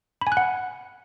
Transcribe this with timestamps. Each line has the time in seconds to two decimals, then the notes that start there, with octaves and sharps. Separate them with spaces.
0.21 B5
0.27 G#5
0.32 F#6
0.37 F#5